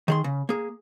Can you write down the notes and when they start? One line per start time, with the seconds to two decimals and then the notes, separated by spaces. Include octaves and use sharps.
0.08 D#3 G#4 C6
0.24 C#3
0.49 A#3 G#4